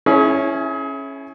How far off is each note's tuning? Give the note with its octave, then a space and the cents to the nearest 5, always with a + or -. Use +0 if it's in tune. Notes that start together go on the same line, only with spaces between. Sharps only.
C#4 -10 E4 +0 G#4 +35